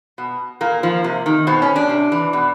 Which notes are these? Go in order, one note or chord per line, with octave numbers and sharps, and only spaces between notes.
B2
A#2 A#3
F3
C3
D#3
B2 C4
C#4
D4
C3
E3
B2